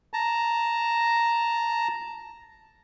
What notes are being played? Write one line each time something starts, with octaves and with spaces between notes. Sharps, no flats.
A5 A#5